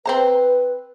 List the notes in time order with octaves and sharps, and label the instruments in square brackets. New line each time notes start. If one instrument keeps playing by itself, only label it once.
[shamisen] C4 C5 A#5 [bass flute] B4